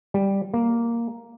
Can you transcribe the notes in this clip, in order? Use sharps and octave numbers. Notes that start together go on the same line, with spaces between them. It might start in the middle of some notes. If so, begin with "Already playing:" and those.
G3
A#3